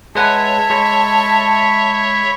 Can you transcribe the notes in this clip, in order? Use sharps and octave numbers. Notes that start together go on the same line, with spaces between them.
G#3 B4 C#5 E5 F#5 A5
G#3 B5 C#6